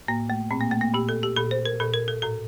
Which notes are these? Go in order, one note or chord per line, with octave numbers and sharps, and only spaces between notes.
A2 A#3
A3
A#2 C4
A#3
A3
A#3
A#2 G4
A4
G4
A#2 A4
C5
A#4
A#2 A4
A#4
A4
A2 A4